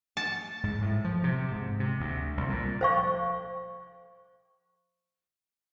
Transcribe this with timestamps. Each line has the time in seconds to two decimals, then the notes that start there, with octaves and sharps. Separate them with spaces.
0.17 A5
0.63 G#2
0.82 A2
1.04 F3
1.24 C3
1.51 G#2
1.80 C3
2.00 D2
2.37 C2
2.50 A#2
2.81 C5 F5 C#6